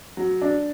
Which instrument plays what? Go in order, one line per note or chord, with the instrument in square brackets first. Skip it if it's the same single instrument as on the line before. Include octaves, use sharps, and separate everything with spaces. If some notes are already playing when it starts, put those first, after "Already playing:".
[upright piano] F#3
D4